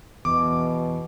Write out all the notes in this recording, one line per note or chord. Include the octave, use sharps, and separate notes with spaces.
E2 B2 D6